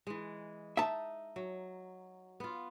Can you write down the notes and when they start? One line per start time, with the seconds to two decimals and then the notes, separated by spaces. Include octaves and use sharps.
0.07 E3 G#3
0.77 D#4 E5 A5
1.36 F#3
2.40 B3 F4